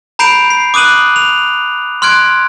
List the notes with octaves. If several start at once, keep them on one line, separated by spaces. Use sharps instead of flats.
A#5 B5 G6 C7 D7 F7
C7
D6 D#6 F#6 D#7 F#7
F7
C6 F6 F#6 G#6 D7